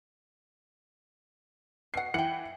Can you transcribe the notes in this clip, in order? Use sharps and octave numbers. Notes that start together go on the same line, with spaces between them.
B2 F#5 C7
E3 F#5 G5 C#7 F#7